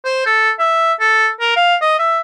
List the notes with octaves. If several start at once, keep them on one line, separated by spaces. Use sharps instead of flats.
C5
A4
E5
A4
A#4
F5
D#5
E5